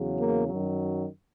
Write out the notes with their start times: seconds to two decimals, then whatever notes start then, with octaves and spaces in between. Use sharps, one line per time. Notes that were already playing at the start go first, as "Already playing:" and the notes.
Already playing: E2 C#3 F#3
0.19 A#3
0.48 F#2 D#3 F#3